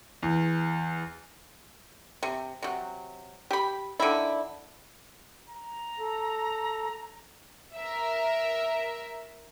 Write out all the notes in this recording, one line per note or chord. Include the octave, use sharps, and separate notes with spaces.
E2
C3
C3 F#3
G4 B5
D3 D#3 E4
A#5
A4
A#4 E5